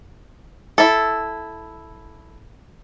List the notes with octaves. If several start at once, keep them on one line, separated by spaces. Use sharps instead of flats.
E4 A4